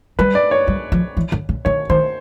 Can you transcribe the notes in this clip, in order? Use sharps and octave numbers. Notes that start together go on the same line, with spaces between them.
G3 B4
D5
C#5
G3
F3
E3
D3
C#3
D#3 C#5
D#3 C5